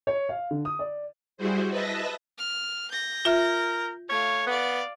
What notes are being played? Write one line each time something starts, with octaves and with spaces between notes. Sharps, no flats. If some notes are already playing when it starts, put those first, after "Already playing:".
C#5
F5
D3
D#6
D5
G3 E4 F#4 G#4 C5
B4 D#5 E5 A5 A#6
F6
G6 A#6
F4 A#4 E5
A3 C#5 F5
B3 D5 F5